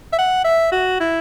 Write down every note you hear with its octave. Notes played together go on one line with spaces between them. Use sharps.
E5
F#5
E5
F#4
E4